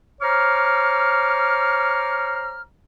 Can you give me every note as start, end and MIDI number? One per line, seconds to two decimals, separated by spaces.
0.21 2.62 72
0.21 2.62 73
0.21 2.62 82
0.21 2.62 86
0.21 2.62 89